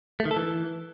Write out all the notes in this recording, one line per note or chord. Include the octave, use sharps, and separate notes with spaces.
A3
D#3
A4
E3